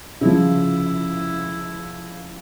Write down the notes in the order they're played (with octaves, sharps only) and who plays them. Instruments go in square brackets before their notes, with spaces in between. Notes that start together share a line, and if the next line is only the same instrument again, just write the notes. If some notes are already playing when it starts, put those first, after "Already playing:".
[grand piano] C#3 F3 [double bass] E4